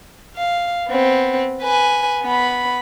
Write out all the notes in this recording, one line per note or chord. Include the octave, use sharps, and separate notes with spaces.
F5
B3 C4
B4 G#5
B3 B5